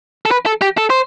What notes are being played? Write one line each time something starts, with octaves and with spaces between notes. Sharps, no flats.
A4
B4
A4
G4
A4
C5